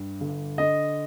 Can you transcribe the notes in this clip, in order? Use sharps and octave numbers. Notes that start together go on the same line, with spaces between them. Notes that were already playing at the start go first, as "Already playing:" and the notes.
Already playing: G2
G1
D3 D#5